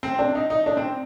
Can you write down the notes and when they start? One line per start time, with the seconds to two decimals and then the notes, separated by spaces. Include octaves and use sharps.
0.03 C4
0.19 D4
0.35 D#4
0.50 D#4
0.66 D4
0.77 C4